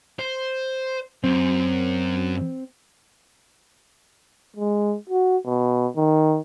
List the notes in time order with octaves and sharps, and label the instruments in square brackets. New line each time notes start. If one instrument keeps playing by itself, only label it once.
[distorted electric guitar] C5
[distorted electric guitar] F#2 [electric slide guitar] C4
[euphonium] G#3
F#4
B2
D#3